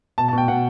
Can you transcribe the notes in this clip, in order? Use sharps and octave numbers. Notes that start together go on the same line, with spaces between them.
B2 A5
A5
B2 G5
B2 F#5